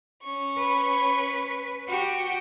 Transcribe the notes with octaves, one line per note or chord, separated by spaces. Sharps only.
C#4 C#6
B4
F#4 G4 G5